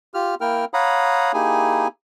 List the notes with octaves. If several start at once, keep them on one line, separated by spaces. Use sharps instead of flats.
F4 G4 F6
A#3 E4 A#4 G5 F6
C#5 F5 F#5 A#5 B5 D#6
A#3 D#4 E4 G4 G#4 G#5